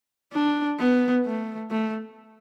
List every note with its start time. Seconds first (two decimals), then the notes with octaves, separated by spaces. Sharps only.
0.33 D4
0.79 B3
1.26 A3
1.71 A3